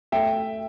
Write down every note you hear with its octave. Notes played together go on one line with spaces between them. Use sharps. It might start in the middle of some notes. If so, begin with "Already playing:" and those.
A3 E5 G5